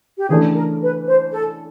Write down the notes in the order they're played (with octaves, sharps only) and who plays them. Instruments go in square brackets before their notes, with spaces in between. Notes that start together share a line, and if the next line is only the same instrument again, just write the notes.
[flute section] G4
[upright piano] C#3 E3 A3 D4 [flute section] G#4
[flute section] A#4
B4
C5
A4